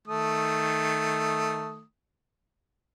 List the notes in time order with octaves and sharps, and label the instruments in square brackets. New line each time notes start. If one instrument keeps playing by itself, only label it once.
[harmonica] D#3 A3 D#6